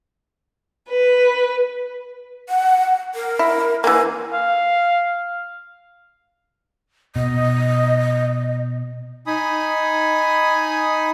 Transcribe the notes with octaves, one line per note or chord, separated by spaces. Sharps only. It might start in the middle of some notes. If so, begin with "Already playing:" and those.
B4
F#5
A#4
E4
E3 A#3 G#5
F5
B2 D#5
D#4 G#5 B5 D#6